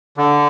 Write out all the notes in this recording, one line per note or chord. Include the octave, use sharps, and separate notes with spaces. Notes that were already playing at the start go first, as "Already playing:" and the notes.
D3